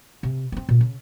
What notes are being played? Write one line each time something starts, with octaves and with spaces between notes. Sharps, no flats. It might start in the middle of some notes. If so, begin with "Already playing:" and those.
C3
B3 C4
A#2
C#3